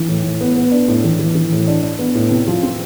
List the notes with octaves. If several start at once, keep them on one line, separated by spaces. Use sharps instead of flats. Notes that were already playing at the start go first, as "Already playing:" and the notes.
Already playing: E3
A2
A2
B3
B3
D4
A2
E3
E3
E3
A2
D4
D4
B3
A2
C3
F3
C4